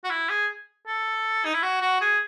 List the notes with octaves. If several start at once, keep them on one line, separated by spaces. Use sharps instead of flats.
F#4
E4
G#4
A4
D#4
E4
F#4
F#4
G#4